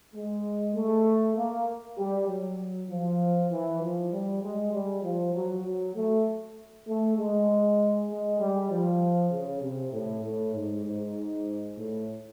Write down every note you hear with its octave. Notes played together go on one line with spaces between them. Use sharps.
G#3
A3
A#3
G3
F#3
F3
E3
F3
G3
G#3
G3
F3
F#3
F#3
A3
A3
G#3
G#3
G3
F3
C#3
C3
A2
A2
G#2
G#2
A2